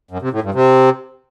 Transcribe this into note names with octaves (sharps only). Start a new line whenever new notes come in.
F#2
C3
A2
G2
C3